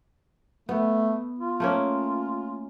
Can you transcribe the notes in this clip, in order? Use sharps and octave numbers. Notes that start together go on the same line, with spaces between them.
A3 B3
F4
A3 A#3 C#4